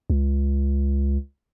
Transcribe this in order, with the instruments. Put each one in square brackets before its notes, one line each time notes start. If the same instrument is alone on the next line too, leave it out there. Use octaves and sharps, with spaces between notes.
[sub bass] C#2